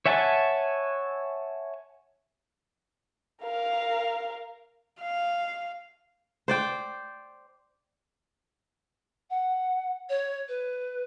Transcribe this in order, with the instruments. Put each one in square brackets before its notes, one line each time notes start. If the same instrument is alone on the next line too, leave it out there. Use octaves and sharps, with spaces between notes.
[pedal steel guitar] C#5 E5 F#5 G#5 A5
[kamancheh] A#4 F5
[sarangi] F5
[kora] C5 D5 G5
[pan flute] F#5
C#5
B4